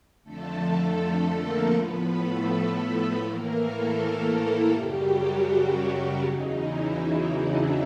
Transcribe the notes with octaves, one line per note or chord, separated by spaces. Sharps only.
F2 D3 F3 A3 A4
A#3 A#4
A2 F3 B3 B4
A3 A4
A3 A4
A2 E3 A#3 A#4
A3 A4
F#2 C#3 F#3 G3 G4
F#3 F#4
G3 G4
E2 C#3 F#3 D#4
E3 E4
D#4
D4